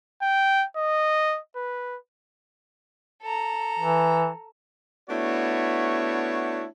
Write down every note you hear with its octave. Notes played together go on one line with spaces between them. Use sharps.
G5
D#5
B4
A4 A#5
E3
A3 B3 D4 E4 F#4 C#5